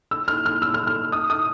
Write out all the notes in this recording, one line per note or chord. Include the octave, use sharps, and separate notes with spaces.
E6
F6
F6
E6
F6
F6
D#6
D#6